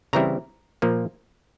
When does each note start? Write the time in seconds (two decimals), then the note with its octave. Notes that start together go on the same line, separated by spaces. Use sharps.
0.13 C#3 E3 G3 C4 E4 A#5
0.82 A#2 F3 A#3